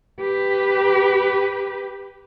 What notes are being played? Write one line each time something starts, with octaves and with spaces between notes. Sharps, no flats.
G4 B4